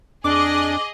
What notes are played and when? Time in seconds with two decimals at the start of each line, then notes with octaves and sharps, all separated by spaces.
0.24 F2 D4 G#4 D#5 D6